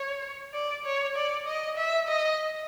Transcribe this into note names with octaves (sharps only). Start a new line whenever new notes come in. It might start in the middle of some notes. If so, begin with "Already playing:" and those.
Already playing: C#5
D5
C#5
D5
D#5
E5
D#5